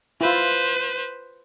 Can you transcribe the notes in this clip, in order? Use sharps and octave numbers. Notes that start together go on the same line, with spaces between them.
E4 F4 B4 C5